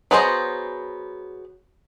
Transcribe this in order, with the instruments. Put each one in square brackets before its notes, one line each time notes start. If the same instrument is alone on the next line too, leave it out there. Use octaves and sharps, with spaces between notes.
[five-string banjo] F#3 B3 G#4 C5 D#5